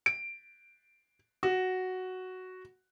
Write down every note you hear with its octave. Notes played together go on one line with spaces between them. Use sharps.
D7
F#4